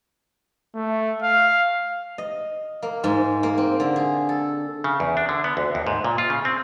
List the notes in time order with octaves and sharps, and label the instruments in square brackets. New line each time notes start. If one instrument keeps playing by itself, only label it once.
[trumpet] A3
F5
[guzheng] D#5
A#3
G#2
A#3
C4
D3
G#4
A4
[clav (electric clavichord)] C#3
E2
D4
D3
B3
D2
D#2
G#2
A#2
F4
C#3
C4